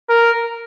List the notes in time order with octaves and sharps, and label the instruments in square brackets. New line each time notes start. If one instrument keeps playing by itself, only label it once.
[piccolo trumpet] A#4